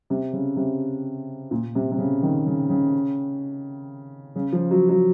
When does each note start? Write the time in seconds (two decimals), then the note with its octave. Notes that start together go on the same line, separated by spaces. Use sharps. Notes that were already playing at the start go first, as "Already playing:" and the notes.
0.10 C3
0.33 C#3
0.56 C3
1.51 A#2
1.75 C3
1.91 C3
1.98 C#3
2.22 D#3
2.46 C#3
2.69 C#3
4.36 C#3
4.53 F3
4.71 F#3
4.89 F#3